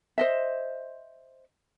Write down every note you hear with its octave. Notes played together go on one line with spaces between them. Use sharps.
C5 D#5 E5